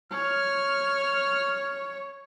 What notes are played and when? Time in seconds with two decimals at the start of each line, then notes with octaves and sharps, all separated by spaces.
0.12 C#5 F6